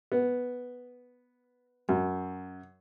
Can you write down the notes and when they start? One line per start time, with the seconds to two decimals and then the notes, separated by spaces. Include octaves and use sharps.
0.12 B3
1.89 F#2